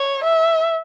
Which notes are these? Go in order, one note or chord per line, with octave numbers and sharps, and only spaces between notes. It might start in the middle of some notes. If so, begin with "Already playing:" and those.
Already playing: C#5
E5